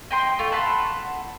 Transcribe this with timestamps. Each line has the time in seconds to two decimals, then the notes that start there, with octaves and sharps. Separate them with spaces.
0.11 D#5 G5 C6
0.39 A3 F4
0.52 F#5 A5 B5 C6